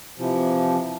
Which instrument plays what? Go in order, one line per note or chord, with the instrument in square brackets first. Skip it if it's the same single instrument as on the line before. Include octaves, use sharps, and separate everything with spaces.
[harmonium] C3 E3 F3